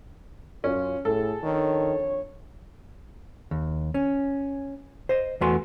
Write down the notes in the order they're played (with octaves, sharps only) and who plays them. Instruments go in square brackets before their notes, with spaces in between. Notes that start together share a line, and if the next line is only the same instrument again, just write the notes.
[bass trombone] F#2 [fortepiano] C#4 [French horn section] F4
[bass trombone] A2 [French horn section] G#4 [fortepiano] A4
[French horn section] F2 D4 C#5 [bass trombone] D#3
[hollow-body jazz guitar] D#2
C#4
C5 D#5
E2 A3 B3 F#4 G#5 C6